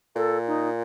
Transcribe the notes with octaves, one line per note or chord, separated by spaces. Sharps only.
A#2 A4
D#4